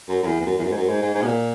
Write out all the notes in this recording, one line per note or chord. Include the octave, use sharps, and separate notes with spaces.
F#2
F#2
E2
E2
F#2
E2
F#2
G#2
F#2
G#2
G#2
G#2
B2
A#2